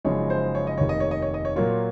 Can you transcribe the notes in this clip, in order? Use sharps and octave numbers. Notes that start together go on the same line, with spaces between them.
F#1 F#2 F3 G#3 D#4 C#5
C5
C#5
D#5
F1 D#2 D#3 C#5
D#5
C#5
D#5
C#5
D#5
C#5
A#2 F#3 A#3 F4 C#5